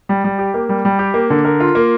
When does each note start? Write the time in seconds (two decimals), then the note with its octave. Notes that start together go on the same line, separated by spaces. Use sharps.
0.09 G3
0.24 G3
0.39 G4
0.54 A#3
0.69 G3
0.85 G3
0.99 G4
1.14 A#3
1.30 D3
1.45 A#4
1.60 F4
1.75 A#3